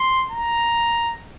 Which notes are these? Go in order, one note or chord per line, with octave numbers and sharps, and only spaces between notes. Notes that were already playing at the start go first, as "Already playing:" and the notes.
Already playing: C6
A#5